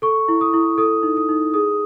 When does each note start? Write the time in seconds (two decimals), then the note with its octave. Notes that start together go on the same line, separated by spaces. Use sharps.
0.02 A4 C#6
0.28 E4
0.41 D#6
0.54 E4
0.78 A4 D#6
1.03 D#4
1.17 D#6
1.29 D#4
1.54 G#4 D#6